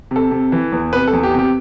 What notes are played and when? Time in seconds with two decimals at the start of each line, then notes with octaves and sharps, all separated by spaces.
0.11 C3 A4
0.31 C3
0.52 E3
0.72 E2
0.93 C3 B4
1.08 A4
1.13 E2
1.23 G4
1.34 C3 G4